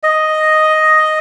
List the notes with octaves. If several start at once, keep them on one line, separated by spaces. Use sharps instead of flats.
D#5